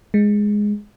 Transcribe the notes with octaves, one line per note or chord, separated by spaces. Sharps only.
G#3